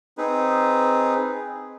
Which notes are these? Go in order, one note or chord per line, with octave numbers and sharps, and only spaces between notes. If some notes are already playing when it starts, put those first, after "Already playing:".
C4 D#4 G#4 B4